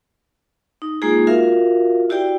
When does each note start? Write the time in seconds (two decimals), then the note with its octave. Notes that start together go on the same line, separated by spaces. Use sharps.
0.82 D#4
1.02 G#3 A#3 D#4 F4 G#4
1.27 F4 F#4 A#4 E5 F5
2.10 E4 F#4 G4 D5 G5